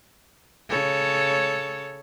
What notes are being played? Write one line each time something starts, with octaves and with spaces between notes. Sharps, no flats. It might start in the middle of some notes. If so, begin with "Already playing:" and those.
C#3 A4 C#5